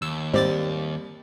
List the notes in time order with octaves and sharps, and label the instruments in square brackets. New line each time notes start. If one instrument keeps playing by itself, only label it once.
[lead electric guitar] D#2 [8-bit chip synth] E6
[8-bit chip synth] G#2 D5 A6 [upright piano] G3 [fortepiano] C4